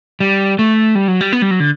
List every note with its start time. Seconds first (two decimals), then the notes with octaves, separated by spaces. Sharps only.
0.20 G3
0.59 A3
0.95 G3
1.08 F#3
1.21 G3
1.32 B3
1.42 G3
1.51 F#3
1.60 D3